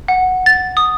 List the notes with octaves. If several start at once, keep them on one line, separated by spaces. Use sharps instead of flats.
F#5
A6
D#6